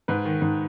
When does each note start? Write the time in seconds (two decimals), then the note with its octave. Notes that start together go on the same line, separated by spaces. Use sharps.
0.08 G#2 B4
0.25 D#3
0.42 G#2